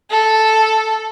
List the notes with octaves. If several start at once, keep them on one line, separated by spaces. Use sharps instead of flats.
A4